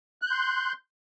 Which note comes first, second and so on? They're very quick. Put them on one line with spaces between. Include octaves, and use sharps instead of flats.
F#6 G6 C6